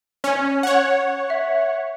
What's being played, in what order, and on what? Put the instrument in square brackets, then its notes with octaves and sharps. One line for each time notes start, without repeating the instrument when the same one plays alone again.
[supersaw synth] C#4
C#5 F#5
[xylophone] E5